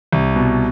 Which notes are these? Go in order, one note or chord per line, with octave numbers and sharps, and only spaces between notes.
C2
B2